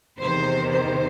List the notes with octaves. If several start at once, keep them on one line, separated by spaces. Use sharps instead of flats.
E2 C3 D#3 C5
C5